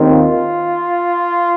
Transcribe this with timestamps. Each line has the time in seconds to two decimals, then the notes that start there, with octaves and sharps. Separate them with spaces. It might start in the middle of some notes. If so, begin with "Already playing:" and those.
Already playing: D#2 D#3 C4
0.08 F4